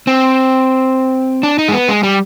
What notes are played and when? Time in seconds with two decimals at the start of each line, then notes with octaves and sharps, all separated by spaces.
0.07 C4
1.43 D4
1.59 D#4
1.69 G#3
1.73 B3
1.88 G#3
2.03 G3